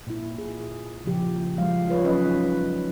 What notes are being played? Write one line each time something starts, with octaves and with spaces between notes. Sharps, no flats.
A#2 E4
G#4
A#2 C#3 F3 G4
F3 G3 G#3 F5
F4 G#4 B4 C#5
F#3 C#4 D#4 B4 D#5